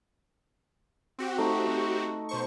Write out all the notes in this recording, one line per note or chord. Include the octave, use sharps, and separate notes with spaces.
C4 F#4 G4
A3 D#4
C#6
B2 C5 C#6